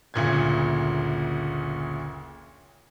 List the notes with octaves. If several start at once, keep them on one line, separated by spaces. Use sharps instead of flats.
F#1 D2 A#2 G#6